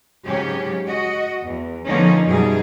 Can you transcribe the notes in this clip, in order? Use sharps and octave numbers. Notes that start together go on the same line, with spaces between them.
G#2 C#3 F#3 C#4 G4
F#4 D#5
E2
D3 F3 A#3 B3 C#4 D#4
F#2 B2 G3 D#4 G#4